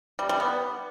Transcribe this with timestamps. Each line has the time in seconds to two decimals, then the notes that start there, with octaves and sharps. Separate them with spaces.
0.19 G3
0.29 G3
0.40 B3